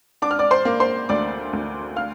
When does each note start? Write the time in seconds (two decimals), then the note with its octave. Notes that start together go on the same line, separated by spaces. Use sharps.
0.22 D4 D6
0.31 F6
0.39 D5 D6
0.51 C5 C6
0.65 A#3
0.80 C5 C6
1.09 D2 D5 D6
1.53 D2
1.96 F5 F6